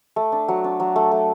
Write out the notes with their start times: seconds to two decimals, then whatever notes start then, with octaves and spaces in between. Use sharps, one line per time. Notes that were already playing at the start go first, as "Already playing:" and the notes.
0.16 A3
0.32 D4
0.48 F#3
0.64 D4
0.80 F#3
0.96 A3
1.12 A3